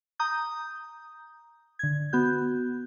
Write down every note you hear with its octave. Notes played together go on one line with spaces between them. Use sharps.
A#5 D#6 G6
D3 G#6
B3 F#4 G6